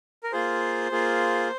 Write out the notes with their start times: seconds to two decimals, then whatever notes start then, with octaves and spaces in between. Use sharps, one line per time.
0.24 A#4
0.32 A#3 F4 G#4 C5
0.92 A#3 F4 G#4